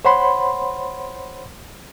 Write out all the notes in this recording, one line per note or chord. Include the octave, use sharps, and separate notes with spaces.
C5 C#5 F#5 B5 C6